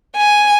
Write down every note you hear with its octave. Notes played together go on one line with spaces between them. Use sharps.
G#5